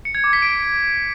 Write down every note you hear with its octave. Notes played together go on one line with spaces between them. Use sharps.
C#7
G#6
D6
B6
D7